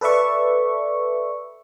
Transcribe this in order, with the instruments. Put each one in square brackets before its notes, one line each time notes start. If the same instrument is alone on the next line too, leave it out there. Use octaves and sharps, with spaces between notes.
[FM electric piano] A4 B4 D5 E5 C#6